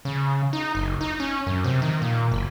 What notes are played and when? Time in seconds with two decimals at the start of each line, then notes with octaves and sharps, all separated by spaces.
0.05 C#3
0.53 D#4
0.75 F#1
1.01 D#4
1.20 C#4
1.46 F#2
1.64 C3
1.82 D#3
2.02 A#2
2.31 F#1